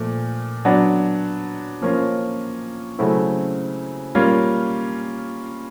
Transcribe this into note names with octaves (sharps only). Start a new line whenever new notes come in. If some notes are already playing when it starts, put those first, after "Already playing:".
Already playing: A#2 F3 A3
F#3 B3 D4
F3 A#3 C#4 F4
C#3 F#3 A3 C4 E4
G3 A#3 C#4 F4